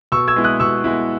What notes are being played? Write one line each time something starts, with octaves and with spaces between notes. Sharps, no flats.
B2 C#6 E6
E6 G#6
G#3 B3 E4
D#6 F#6
B2 C#6 E6
G#3 B3 E4